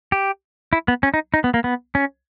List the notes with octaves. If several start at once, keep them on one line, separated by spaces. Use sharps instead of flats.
G4
E4
B3
C#4
D#4
D#4
B3
A#3
B3
C#4